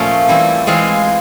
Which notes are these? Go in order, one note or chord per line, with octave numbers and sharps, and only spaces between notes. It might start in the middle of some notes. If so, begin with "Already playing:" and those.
Already playing: A#2 F3 A3 C#4
E3 G3 C4 E4
E3 G#3 C4 F4 G#4